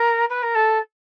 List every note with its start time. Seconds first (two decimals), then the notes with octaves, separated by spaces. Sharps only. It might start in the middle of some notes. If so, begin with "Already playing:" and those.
Already playing: A#4
0.30 B4
0.43 A#4
0.55 A4